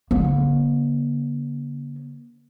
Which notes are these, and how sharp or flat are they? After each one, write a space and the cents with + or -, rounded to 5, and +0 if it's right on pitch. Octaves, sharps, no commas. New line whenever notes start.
D3 -45 A#3 +35